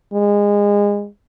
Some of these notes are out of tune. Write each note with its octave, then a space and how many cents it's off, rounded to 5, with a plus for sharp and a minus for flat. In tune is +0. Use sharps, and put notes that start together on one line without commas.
G#3 -25